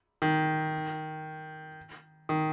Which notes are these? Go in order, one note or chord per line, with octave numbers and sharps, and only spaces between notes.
D#3
D#3